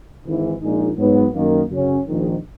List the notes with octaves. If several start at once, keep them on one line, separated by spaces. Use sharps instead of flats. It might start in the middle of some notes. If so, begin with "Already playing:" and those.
G#1 G#2 E3
A#1 A#2 G#3 D#4
G#2 F#3 B3
F#2 D#3 A#3
F#2 C#3 F#3 C#4
A#1 G#2 D#3